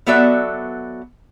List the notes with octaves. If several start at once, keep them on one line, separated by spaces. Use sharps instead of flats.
F#3 B3 F#4 A4 D5 E5